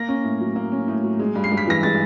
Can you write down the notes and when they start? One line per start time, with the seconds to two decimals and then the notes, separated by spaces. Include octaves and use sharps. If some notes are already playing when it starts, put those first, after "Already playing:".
Already playing: A#3 A#6
0.08 C#4
0.24 A2
0.40 F#3
0.56 A#3
0.72 C#4
0.88 A2
1.04 F#3
1.19 G#3
1.35 G2
1.44 C7
1.51 G2
1.57 B6
1.67 E3 A#6
1.83 G#3 A6